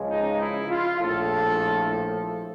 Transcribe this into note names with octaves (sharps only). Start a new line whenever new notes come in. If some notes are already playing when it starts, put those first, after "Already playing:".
Already playing: C#2 C#3 F3 G#3
D#4
E4
F4
A#1 A2 F3 A4